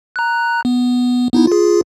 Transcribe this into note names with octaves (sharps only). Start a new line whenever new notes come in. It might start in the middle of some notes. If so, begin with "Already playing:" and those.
A#5 F#6
B3
B3 D#4 E4
F4 G#4